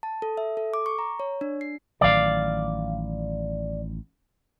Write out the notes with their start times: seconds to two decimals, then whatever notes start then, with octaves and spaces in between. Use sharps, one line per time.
0.03 A5
0.22 A4
0.37 E5
0.57 A4
0.74 D6
0.86 C#6
0.99 A#5
1.20 C#5
1.41 D4
1.61 C7
2.01 A1 D#3 F#3 D5 F5